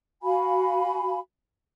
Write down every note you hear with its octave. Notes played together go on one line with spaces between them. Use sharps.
F#4 F5 G#5 B5